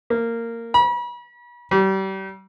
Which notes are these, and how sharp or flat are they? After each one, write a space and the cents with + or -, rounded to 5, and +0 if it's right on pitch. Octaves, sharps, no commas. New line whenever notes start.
A#3 -15
B5 -40
G3 -30